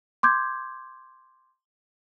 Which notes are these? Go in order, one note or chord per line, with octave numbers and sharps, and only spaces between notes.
C6 D6 G6 G#6